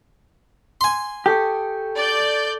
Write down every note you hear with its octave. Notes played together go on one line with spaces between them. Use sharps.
G#5 C6
G4 A4 C#6 D#6
D5 G6